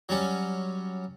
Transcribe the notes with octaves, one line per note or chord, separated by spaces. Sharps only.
F#3 G3 C#4